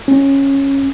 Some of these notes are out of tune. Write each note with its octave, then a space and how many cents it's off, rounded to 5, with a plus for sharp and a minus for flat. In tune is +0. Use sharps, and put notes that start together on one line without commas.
C#4 -10